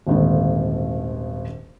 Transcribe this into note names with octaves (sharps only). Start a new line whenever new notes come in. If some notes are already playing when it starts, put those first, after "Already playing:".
D#1 G#1 D3